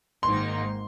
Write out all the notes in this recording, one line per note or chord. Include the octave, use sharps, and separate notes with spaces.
G#1 G#2 D#3 A#3 D#4 C6